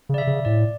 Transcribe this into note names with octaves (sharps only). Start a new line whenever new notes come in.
C#3 D5
E5
C#3
A2 D5